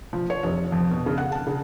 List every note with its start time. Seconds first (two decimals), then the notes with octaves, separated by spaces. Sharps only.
0.13 F3
0.30 C#5
0.43 F1
0.72 F2
0.91 B2
1.06 C#3
1.18 F#5
1.32 A5
1.47 C#3